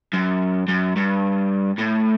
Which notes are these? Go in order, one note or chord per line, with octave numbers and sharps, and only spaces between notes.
F#2
F#2
G2
A2